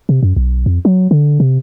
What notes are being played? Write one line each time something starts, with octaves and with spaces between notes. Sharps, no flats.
C3
F#2
B1
F2
F#3
D3
C3